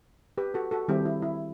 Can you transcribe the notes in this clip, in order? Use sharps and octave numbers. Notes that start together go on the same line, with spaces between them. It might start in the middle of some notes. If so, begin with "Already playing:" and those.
G4 B4
F#4 A4
F#4 A4
D#3 G3 C4 E4 G4
E4
E4